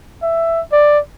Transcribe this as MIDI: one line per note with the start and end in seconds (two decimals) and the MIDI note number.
0.23 0.61 76
0.72 0.99 74